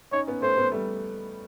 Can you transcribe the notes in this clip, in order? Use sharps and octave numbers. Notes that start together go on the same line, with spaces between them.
C#4 D#4 C#5
B3 C#4
A3 B3 C5
A3 B3
G3 A3